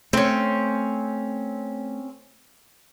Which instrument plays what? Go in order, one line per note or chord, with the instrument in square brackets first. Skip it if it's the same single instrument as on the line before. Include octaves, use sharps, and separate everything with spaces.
[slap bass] A3 [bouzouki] C4 C#4